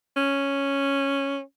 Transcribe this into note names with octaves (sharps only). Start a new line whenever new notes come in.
C#4